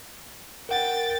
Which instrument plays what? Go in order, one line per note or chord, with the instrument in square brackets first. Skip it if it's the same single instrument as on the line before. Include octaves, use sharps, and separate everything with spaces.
[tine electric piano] A#4 F#5 [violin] G5 A6